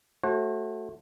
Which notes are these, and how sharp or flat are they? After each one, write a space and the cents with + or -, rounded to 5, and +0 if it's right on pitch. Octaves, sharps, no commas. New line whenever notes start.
A3 +0 F#4 +0 C5 +45